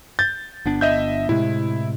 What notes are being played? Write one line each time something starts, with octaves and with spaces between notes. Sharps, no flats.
G6 A6
G1 B3 D4
D#5 E5 G6
A2 C3 G#3 E4